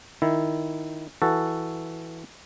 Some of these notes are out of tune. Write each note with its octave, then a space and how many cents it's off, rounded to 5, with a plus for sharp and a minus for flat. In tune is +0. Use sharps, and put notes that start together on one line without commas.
D#3 +0 E4 +0
E3 +0 F#4 +0 A4 +0